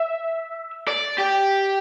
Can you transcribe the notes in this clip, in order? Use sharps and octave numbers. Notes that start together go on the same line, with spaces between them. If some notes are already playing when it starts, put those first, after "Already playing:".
Already playing: E5
D5
G4